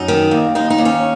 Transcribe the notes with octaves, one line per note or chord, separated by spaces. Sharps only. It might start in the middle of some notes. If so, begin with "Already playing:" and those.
Already playing: F#2 D#4
D#3
D#2
D#2 D#4
D#4
D#2
C#4